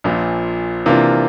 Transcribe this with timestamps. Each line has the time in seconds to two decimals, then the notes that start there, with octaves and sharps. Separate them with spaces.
0.04 A#1 A#2 F3
0.86 C3 E3 A#3 D4 F4